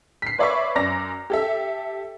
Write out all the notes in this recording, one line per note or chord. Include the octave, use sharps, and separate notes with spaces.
B6 C7
B4 C#5 D5 E5 B5 C#6
F#2 D5 A#5 A#6
G4 A4 E5